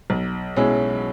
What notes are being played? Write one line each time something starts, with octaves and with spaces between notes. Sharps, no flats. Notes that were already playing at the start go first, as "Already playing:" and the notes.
B1
B2 G#3 C#4 E4